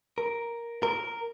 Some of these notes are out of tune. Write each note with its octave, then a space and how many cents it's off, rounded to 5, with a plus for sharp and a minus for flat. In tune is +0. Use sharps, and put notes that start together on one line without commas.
A#4 +5
A#4 -5